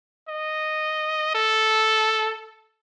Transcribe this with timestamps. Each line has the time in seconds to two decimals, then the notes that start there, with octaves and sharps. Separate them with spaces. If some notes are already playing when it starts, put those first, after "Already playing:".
0.29 D#5
1.35 A4